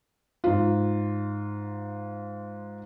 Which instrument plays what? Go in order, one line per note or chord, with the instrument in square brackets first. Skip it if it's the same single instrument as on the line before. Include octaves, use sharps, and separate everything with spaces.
[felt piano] G#2 F4